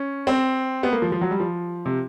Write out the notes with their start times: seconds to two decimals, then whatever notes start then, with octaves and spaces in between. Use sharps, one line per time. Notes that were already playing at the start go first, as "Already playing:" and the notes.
Already playing: C#4
0.27 C4
0.83 B3
0.93 A#3
1.02 F3
1.12 F3
1.21 F#3
1.31 G3
1.40 F3
1.86 C3